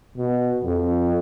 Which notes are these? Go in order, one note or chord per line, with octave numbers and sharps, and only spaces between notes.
B2
F2